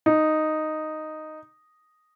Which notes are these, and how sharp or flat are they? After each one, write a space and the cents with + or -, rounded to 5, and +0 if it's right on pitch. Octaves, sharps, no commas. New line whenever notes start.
D#4 -5